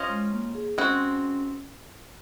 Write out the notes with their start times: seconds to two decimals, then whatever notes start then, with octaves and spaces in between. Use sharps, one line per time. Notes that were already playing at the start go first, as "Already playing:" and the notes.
Already playing: C#4 F4 C5 D#5
0.09 G#3
0.33 A#3
0.54 G#4
0.78 G#3 C4 C#4 F#4